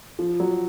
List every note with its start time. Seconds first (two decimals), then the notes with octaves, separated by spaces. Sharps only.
0.19 F3
0.40 F#3